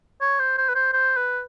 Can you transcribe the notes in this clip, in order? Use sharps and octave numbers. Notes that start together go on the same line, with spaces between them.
C#5
C5
C5
B4
C5
C5
B4